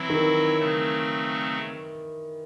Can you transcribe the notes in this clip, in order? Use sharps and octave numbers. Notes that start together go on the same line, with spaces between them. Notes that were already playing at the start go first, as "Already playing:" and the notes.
Already playing: E3 F#3 C4 E4
D#3
C#3 F#3 A3 C4